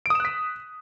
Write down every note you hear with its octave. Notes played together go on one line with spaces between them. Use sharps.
D#6 F#6 B6 D7 E7